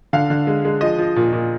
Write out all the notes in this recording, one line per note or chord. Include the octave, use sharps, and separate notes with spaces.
D3 F5
D3
G#3
G#3
F3 D#5
F3
A#2
A#2